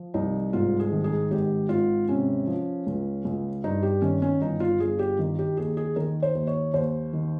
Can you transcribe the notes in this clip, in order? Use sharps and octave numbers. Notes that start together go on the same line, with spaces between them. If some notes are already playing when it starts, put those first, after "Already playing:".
Already playing: F3
C2 D#4
G#2 F4
G#4
D#3
G#4
G#1 G4
G#1 F4
C3 C#4
F3
C#2
C#2
G2 D#4
G4
D#3 C#4
C#4
G1 D#4
F4
G1 G#4
G4
D#3
G4
D#2 G#4
G#4
D#3 A#4
C5
D#2
C#5
D#2 C5
D#3